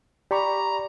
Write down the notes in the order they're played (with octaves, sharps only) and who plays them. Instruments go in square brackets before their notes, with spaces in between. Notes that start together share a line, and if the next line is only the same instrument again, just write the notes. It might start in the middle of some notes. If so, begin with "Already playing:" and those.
[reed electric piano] G4 B5 C#6 [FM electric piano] D5 [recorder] A#5